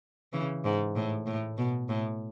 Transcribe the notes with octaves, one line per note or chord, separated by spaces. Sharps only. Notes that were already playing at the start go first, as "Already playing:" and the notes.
C#3 E3
G#2
A2
A2
B2
A2